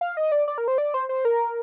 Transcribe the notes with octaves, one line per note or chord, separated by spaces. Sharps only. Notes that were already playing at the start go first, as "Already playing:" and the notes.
F5
D#5
D5
D5
A#4
C5
D5
C5
C5
A#4